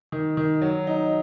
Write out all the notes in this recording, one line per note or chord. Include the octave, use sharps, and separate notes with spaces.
D#3
D#3
F#3
D#4